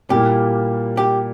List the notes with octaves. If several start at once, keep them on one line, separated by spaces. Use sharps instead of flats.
A#2 G3 A#3 E4 G4
G4